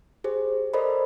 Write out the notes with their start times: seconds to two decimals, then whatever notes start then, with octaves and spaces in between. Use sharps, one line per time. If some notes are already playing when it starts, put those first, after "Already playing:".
0.24 G4 G#4 C5
0.74 A4 A#4 C5 D5 D#5 B5